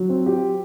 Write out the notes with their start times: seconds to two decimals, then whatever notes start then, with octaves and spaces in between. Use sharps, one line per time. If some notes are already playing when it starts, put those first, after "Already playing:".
Already playing: F#3
0.09 C4
0.26 G4